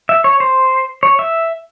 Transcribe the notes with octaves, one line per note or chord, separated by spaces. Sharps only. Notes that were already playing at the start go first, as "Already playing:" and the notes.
E5
C#5
C5
C#5
E5